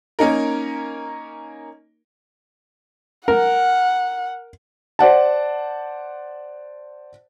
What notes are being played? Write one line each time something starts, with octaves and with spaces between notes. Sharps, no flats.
A#3 C#4 D#4 A#4
A#4 F#5
C5 D5 F#5 A5